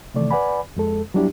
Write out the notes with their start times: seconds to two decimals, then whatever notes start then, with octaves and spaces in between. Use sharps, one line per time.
0.14 C3 D#3 E3 A3 D5
0.31 B4 D5 F#5 G#5 B5
0.76 F2 G#3 A4
1.14 F#3 G3 B3 D4 E4 G4